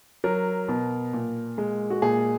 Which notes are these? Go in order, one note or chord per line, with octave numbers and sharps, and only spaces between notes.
F#3 A#4
B2
A#2
G#3
F#4
A#2 G#4